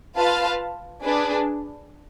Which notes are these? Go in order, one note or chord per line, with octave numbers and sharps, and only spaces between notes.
F4 B4 F5 A5
D4 G#4 B4